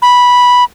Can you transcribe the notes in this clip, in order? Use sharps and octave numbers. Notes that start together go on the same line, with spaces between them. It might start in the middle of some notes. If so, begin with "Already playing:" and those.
B5